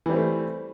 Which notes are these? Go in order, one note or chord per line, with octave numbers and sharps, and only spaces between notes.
E3 G3 A3 C4